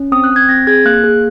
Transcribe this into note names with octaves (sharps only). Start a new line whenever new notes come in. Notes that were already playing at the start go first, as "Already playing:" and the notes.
Already playing: C#4
C4 D#6
F#6
C4
G#6
C4 A#6
G#4 G#6
A#3 F#6
G#4